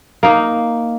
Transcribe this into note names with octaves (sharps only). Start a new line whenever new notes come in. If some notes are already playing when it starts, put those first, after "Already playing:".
A#3 D#4